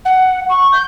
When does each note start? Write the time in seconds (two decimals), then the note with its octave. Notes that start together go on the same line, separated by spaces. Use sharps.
0.05 F#5
0.49 C#6
0.72 G6